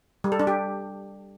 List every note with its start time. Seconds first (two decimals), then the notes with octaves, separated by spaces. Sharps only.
0.24 G3
0.32 A4
0.40 D4
0.47 G4